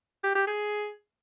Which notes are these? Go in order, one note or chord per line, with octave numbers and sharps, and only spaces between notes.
G4
G4
G#4